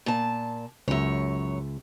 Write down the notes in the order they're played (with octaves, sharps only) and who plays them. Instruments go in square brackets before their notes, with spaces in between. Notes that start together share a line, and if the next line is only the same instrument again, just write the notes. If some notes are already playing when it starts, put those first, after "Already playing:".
[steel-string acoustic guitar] A#2 A5
[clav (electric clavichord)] C#2 E5 [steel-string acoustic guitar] F#2 C#5